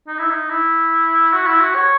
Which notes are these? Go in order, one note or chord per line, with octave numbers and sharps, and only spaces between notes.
D#4
E4
D#4
E4
F#4
E4
F#4
C#5